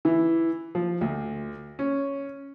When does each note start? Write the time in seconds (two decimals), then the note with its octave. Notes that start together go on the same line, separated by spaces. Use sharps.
0.05 E3
0.75 F3
1.01 D2
1.79 C#4